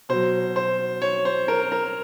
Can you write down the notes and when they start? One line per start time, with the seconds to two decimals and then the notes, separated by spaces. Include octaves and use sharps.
0.09 B2 F#3 C5
0.56 C5
1.02 C#5
1.25 C5
1.48 A#4
1.72 A#4